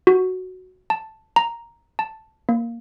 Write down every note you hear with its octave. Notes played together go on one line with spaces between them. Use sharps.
F#4
A5
A#5
A5
A#3